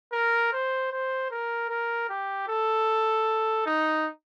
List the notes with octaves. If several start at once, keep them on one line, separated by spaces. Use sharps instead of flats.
A#4
C5
C5
A#4
A#4
G4
A4
D#4